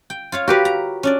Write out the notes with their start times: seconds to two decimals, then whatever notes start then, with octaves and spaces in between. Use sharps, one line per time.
0.10 G5
0.32 F4 C#5 F5
0.48 F#4 G4 A#4 B4 C#5 F5
0.65 A#5
1.03 C#4 D4 D5